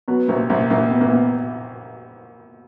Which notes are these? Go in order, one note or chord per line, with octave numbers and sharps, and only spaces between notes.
B2 F#3 B3
C2 A#2 A#3
C2 A#2 A#3
C2 A#2 A#3
B2
A#2 A#3
B2